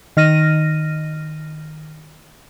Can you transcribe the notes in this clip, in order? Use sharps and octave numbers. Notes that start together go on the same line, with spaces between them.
D#3 F6 A#6 D#7